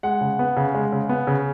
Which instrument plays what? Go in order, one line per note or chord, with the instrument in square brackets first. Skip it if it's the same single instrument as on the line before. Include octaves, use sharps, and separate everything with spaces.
[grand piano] G#3 F#5
C#3
B3
C#3
G#3
C#3
B3
C#3